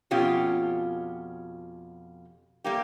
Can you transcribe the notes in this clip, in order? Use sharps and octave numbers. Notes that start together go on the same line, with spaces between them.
F2 B2 C#4 F4 G4
G3 A#3 G4